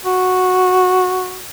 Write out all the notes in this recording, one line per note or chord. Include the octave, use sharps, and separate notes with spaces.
F#4